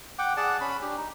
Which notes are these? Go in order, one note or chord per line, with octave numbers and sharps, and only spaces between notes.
F#5 G5 D6
G#4 D5 F#5 A5
C#4 B5
D4 G4
D#4